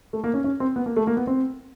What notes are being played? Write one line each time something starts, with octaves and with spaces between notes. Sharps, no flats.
A3
A#3
C#4
C#4
C4
B3
A#3
A3
A#3
B3
C4